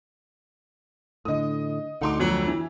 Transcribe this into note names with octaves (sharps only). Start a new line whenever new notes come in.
A2 D3 D#5 D#6
D2 D3 D#4 F#5 C6 D6
F2 F#3
E3